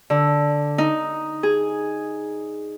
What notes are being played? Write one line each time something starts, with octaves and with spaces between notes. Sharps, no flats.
D3
D#4
G#4